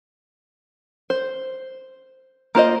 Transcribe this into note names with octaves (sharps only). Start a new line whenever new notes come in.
C5
A#3 F4 C5 D#5